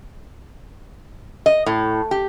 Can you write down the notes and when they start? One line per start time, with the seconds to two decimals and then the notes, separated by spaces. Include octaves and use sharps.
1.46 D#5
1.66 A2
2.11 G4